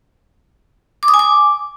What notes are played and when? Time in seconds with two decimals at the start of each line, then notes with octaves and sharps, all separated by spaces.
1.03 D6
1.08 D#6
1.14 G#5
1.19 D6